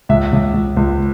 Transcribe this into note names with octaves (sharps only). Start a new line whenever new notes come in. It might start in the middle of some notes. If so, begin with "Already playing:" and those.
C#2 E5
C#2
C#2
C#2